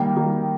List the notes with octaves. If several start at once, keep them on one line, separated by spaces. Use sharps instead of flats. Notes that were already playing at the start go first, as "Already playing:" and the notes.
Already playing: D#3 G3 A#3
D#3 G3 A#3